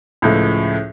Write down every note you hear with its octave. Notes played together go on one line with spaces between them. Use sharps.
C#2 A2 F3